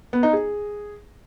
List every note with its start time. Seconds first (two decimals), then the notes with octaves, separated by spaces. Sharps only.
0.13 B3
0.23 D#4
0.33 G#4